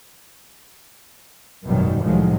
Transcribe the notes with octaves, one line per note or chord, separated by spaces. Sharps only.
G#1 F#2 B2 D#3 F#3 G3
C2 A2 D#3 F3 F#3 G#3